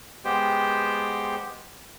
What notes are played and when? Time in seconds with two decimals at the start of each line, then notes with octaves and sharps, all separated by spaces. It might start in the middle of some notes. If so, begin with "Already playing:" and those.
0.25 G#3 B3 G4 C5 G5